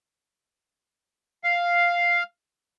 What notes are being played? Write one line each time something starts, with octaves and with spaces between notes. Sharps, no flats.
F5